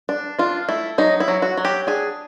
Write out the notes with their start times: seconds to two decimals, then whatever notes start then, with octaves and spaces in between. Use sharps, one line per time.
0.09 D4
0.39 D4 F4
0.69 A3 E4
0.98 F#3 D#4
1.20 E4
1.28 F#3
1.42 F#4
1.57 F#3
1.65 G4
1.87 D4 G#4